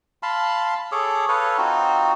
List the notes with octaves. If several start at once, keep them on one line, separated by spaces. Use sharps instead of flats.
F5 A5 B5 C6
G#4 A4 C#5 D6
A4 B4 C#5 F5
C4 D#4 F4 F#4